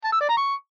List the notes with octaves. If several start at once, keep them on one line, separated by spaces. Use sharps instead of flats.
A5
E6
D5
A#5
C#6